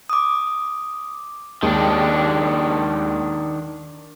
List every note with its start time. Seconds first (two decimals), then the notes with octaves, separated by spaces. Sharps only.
0.09 D6 D#6
1.63 D#2 D#3 G#3 D4